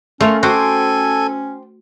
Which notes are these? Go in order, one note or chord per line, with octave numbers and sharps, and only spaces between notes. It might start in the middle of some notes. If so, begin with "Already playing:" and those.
A3 C#4 F4 A#4 C#5
F#4 A4 C5 G5 G#5 D6